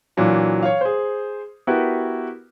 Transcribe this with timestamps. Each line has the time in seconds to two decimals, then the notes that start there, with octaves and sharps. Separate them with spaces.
0.17 A#2 E3 F#3 D4
0.63 C#5 F5
0.81 G#4 C5
1.67 B3 E4 F#4 G4 A#4 B4